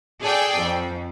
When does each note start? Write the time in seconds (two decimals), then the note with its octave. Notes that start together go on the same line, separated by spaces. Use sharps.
0.21 G#4 A4 D5 G5 G#5
0.58 F2